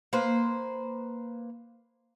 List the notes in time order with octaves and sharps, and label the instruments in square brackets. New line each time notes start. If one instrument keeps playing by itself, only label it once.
[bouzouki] A#3 B4 C5